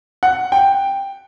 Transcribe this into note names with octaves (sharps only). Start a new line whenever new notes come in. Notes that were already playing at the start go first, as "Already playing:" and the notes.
F#5
G5